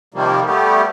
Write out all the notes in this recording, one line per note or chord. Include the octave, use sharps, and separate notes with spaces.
C3 D#3 F3 G3 A#3
G3 A3 B3 G4